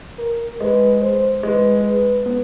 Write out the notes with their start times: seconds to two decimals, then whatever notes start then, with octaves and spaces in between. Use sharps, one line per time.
0.18 A#4
0.60 G#3 B4
1.01 C5
1.43 G#3 B4
1.84 B4
2.26 B3